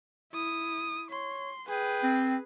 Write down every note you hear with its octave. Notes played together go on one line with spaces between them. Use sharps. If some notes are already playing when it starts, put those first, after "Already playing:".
E4 D#6
C#5 C6
G#4 B4 G5
C4